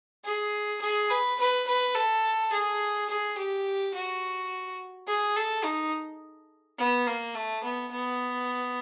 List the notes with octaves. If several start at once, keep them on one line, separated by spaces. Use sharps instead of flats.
G#4
G#4
B4
B4
B4
A4
G#4
G#4
G4
F#4
G#4
A4
D#4
B3
A#3
A3
B3
B3